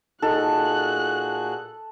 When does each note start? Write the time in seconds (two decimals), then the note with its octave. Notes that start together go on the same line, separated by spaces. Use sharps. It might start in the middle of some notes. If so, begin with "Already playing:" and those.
0.22 A#2 D#4 F#4 G#4 A4 F#6